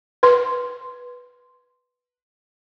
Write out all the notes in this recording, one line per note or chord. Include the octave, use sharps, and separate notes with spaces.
B4 C6